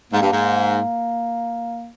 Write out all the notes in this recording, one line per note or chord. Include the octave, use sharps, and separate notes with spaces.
G#2 A#3
G2
G#2